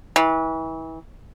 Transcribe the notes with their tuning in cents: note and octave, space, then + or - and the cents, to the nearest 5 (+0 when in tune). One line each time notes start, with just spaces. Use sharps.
E3 -30